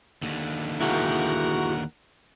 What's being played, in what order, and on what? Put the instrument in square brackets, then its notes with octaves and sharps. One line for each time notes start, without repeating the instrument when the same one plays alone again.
[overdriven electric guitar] D#2 D3
[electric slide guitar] E4 F#4 G#4 [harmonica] A#4 F#5